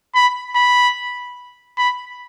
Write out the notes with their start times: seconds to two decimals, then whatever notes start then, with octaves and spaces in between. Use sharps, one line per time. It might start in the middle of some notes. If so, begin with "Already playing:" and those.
0.15 B5
0.55 B5
1.77 B5